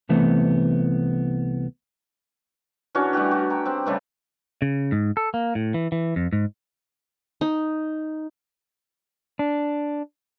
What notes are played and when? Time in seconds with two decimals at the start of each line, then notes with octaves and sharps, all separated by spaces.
0.09 C2 E3 A3 B3 C4
2.95 E3 C#4 D4 F#4
3.13 G3 A3 F#4 G4
3.31 F#4
3.50 G5 G#5 A#5
3.65 C4 G4 F#5
3.86 C#3 G3 A3 B4
4.62 C#3
4.92 G#2
5.17 A4
5.34 A#3
5.55 A2
5.74 E3
5.92 E3
6.16 F2
6.33 G#2
7.41 D#4
9.39 D4